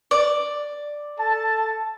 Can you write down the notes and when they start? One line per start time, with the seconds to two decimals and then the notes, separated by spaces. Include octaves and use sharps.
0.11 D5
1.18 A4 A5